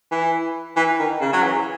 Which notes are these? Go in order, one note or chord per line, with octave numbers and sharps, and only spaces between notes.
E3
E3
D#3
C#3
F#3
E3